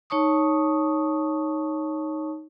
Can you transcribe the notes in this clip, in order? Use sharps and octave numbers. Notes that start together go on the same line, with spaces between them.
D#4 C#5 A5 C#6 D#6